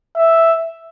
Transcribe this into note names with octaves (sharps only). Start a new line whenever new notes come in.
E5